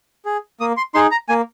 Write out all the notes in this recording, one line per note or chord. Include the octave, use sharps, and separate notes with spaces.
G#4
A#3 D#6
C6
D#4 G#4 C6
A#5
A#3 G#5